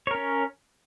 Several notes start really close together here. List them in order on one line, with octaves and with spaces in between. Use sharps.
C#5 A#4 C#4